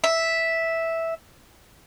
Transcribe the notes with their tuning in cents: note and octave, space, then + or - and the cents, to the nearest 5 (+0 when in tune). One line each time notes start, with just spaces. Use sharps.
E5 -5